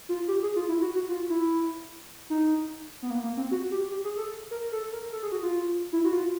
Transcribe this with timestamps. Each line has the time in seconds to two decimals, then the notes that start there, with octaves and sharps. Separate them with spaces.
0.09 F4
0.28 G4
0.43 G#4
0.56 F4
0.68 E4
0.82 F#4
0.96 F#4
1.09 F4
1.30 E4
2.30 D#4
3.02 B3
3.10 A#3
3.24 A#3
3.37 C4
3.51 F#4
3.71 G4
3.90 G4
4.04 G#4
4.17 A4
4.51 A#4
4.72 A4
4.92 A#4
5.12 A4
5.22 G#4
5.32 F#4
5.43 F4
5.93 E4
6.04 F#4
6.13 F4